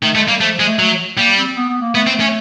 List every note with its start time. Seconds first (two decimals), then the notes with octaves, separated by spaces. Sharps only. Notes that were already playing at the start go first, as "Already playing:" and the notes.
0.03 D#3 A3
0.15 G#3 A3
0.28 G3 A#3
0.41 F3 A3
0.54 F3
0.60 G#3
0.66 A3
0.79 F#3 A3
1.17 G3 A#3
1.37 C4
1.57 B3
1.69 B3
1.81 A#3
1.95 A3 B3
2.07 C4
2.14 A3
2.20 C#4